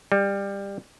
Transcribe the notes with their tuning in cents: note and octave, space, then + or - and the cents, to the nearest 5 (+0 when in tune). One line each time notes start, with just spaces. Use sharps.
G3 +20